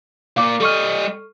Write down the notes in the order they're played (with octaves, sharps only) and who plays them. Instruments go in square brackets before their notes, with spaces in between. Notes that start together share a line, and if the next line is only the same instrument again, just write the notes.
[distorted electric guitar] A#2 A#3 [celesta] F5 D6
[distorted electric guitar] G3 D#5 [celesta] A4 C#6 F6